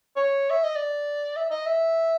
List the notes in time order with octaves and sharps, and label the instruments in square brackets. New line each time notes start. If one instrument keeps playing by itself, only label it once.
[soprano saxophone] C#5
E5
D#5
D5
E5
D#5
E5